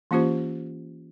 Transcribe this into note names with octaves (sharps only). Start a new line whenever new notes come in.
E3 A#3 C#4 F4 G4 C5